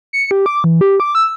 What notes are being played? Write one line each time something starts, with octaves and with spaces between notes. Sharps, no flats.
C#7
G4
D6
E3
G4
D6
E6